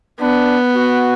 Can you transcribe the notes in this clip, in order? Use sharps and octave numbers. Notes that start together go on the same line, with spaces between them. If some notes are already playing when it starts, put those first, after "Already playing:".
B3 D4
F#4